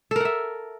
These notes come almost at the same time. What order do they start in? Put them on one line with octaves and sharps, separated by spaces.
A4 A#4 F#5 E5